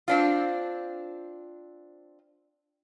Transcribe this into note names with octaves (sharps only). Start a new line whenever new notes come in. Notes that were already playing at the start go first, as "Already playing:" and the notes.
C4 D4 F4